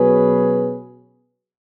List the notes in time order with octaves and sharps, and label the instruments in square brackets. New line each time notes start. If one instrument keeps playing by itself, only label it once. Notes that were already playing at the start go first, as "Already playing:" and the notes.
Already playing: [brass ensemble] B2 F#3 C#4 G#4 B4